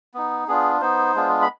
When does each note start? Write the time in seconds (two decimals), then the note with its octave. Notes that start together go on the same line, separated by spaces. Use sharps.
0.14 B3 D#4
0.48 B3 D4 F4 G#4
0.81 B3 D#4 C5
1.15 G#3 B3 D4 F4
1.42 B5